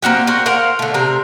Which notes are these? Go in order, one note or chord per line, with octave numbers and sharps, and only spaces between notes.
A#3 C4 F#4 G4
F#4 A#4 C5
A#4 C5 F5 F#5
D3 A3
C3 C4 A#4